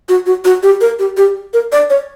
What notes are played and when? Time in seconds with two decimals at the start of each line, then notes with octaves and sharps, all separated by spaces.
0.09 F#4
0.26 F#4
0.45 F#4
0.63 G4
0.81 A#4
0.99 G4
1.17 G4
1.53 A#4
1.72 D5
1.90 C#5